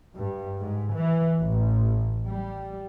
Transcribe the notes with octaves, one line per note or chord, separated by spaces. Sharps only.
G2
G#2
E3
A1
G3